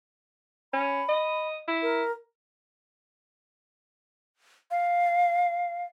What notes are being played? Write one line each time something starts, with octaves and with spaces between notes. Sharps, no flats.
C#4 B5
D#5
E4
A#4
F5